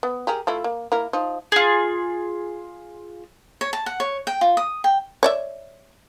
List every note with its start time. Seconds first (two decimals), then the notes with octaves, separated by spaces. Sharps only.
0.03 B3
0.27 G4 G#4 A#4
0.47 A3 E4 F4
0.64 A#3
0.92 A#3 E4 A#4
1.13 F3 D#4
1.52 F4 G#4
3.61 C#5
3.73 A5
3.86 F#5
4.00 C#5
4.27 G5
4.41 F4
4.57 D#6
4.84 G5
5.23 C#5 D5 E5